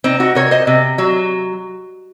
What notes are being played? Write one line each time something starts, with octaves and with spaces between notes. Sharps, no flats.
C3 C4 D#4
D#4 F#4
C3 A#4 C#5
C5 D#5
C3
F#3